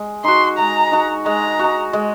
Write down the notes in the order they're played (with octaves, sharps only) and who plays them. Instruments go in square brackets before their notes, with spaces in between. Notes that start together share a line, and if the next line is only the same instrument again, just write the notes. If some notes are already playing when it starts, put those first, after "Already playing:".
Already playing: [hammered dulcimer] G#3
[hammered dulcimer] D#4 F#4 [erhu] C6
[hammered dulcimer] G#3 [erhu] A#5
[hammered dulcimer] D#4 F#4
[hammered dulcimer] G#3 [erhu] A#5
[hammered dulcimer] D#4 F#4
G#3